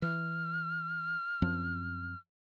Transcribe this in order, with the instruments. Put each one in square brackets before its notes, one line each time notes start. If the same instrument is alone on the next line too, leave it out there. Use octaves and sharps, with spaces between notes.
[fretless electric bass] E3 [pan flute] F6
[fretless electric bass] F#2 F3 C4